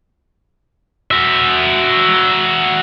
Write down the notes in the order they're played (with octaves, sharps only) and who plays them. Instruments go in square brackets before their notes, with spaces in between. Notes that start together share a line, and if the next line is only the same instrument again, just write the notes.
[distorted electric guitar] F#4 E5